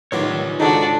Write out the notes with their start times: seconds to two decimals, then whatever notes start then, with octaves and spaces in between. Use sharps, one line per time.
0.12 A2 D#3 E3 F#3 G3 F4 C#5
0.60 G#2 C#3 D4 D#4 F#4 A4